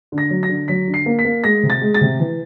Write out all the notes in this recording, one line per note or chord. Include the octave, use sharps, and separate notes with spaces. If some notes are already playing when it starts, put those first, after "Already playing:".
D3
A#6
F#3
A#6
D3
F#3 B6
D3
C7
A#3
B6
A#3
G#3 A#6
C3
A6
G#3
A6
C3
E3